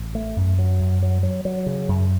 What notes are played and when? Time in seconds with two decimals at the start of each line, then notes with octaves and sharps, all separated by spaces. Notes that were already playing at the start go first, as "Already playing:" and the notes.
Already playing: A1
0.15 A3
0.36 F#2
0.59 F#3
0.80 F#2
1.02 F#3
1.23 F#3
1.45 F#3
1.66 C#3
1.88 F#2